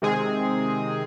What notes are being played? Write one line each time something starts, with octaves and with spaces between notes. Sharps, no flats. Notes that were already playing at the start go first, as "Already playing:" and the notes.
C3 D#3 G#3 C4 G#4